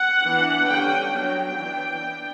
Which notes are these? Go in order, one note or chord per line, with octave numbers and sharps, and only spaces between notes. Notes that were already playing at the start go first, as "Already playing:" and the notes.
Already playing: F#5
E3 B3 D4
D3 G3 C#4 G5
F#3 B3 D4 G5
E3 B3 D4
B3 D4